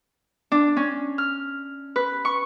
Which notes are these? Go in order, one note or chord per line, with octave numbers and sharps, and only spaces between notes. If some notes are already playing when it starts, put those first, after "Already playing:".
D4
C#4
F6
B4
C#6